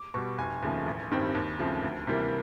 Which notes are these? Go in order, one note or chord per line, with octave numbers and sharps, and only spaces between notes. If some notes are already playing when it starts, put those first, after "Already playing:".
Already playing: D6
B2 G3 C#6
F1 G#5
D#2 C#3 F3 A3
A1
G2 D#3 G3 C4
D#2
C#3 F3 A3 C4
D2
C3 E3 G3 A#3